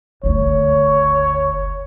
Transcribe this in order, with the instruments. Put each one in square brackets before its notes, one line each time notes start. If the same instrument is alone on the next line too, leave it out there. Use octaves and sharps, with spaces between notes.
[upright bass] F#1 D2 [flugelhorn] C#5